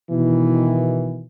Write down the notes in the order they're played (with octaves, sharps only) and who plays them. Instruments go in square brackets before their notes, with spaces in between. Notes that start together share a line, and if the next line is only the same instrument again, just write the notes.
[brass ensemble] B2 D#3 E3